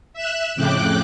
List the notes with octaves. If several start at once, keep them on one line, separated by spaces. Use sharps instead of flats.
E5 E6 F#6
F2 A2 C#3 G5 D6 F#6